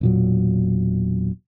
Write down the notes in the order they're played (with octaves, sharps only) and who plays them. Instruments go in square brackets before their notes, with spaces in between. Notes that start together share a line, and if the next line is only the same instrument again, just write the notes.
[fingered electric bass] E1 A#2 F#3